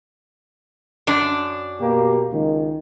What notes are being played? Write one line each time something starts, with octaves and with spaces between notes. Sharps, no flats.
F#2 D4
B2 A#3 G4
C#2 D#3